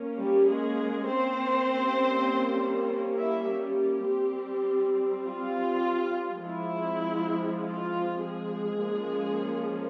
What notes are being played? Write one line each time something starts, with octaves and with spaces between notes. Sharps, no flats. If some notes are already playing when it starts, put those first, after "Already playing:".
Already playing: A#3 C#4
G3 G4
G#3 G#4
C4 C5
G3 A#3 C#4
E4 E5
G3 G4
G3 C4
F4
F3 G#3 C4 E4
F4
G#3 G#4
F3 A#3 C#4